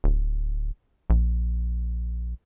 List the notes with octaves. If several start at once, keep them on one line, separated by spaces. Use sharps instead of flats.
D1
A#1